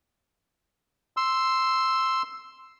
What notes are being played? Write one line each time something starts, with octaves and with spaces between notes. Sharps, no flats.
C6 E6